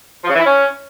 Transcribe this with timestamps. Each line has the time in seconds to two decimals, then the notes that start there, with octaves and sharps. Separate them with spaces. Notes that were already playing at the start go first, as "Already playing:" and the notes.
0.24 F3
0.29 C#3
0.35 E3
0.40 E4
0.45 C#4